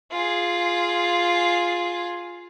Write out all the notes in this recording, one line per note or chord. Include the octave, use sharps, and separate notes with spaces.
F4 G#4